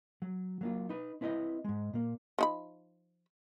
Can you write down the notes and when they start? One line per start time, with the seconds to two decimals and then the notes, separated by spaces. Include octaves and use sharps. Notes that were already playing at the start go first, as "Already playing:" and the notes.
0.22 F#3
0.61 F#3 A#3 F4
0.89 D#4 B4
1.21 C4 E4 B4 D5 D#5
1.64 G#2 G#3
1.93 A#2 A#3
2.39 F3 D#4 B5